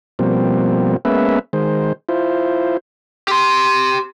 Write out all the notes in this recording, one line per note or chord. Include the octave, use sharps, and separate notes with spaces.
B2 F3 G3 A#3 C4
G#3 A#3 B3 C#4 B4 E5
D#3 G#3 C5
E4 F4 C5
G4 C6